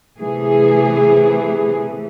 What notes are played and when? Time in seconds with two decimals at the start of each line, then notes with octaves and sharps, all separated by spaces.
0.17 C3 E3 A3 G#4